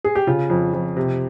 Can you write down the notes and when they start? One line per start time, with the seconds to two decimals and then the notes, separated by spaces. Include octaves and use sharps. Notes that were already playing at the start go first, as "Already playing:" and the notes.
0.04 G#4
0.15 G4
0.27 C#3 F4
0.50 F2
0.73 F2
0.97 C3